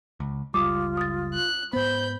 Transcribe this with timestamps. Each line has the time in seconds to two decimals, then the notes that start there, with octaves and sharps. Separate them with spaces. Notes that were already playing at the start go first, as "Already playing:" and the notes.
0.20 C#2
0.54 F#1 C#2 G3 F4 D6 D#6
0.97 D#6 A6
1.34 F#6
1.73 G#2 B3 C5 B5 G6